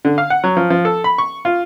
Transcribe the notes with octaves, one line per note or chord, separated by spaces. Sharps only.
D3
F5
F#5
F#3
F3
F3
A4
B5
C#6
F4